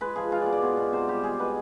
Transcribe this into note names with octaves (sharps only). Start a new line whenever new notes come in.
G#3 B4
F3 G#4
G#3 F4
B2 D5
D5
B2
B2
C3 C5
G3 G4
G#3 G#4
B2 B4